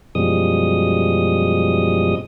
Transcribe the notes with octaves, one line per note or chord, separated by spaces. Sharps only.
F#2 B2 F3 G3 G#3 D#6